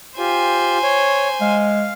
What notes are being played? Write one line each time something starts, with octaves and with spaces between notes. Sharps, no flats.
F4 G4 C5 G#5
C#5
G#3 F5